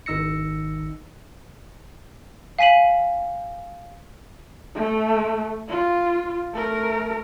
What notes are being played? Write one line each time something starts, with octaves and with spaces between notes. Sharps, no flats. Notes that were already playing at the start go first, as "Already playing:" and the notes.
G#1 D#3 D#4 E6 A#6 C#7
F5 G#5 B6 D#7 F#7
A3
F4
A3 A#4